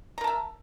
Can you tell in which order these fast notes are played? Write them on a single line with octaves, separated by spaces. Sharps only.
A#5 A#4 A5 E5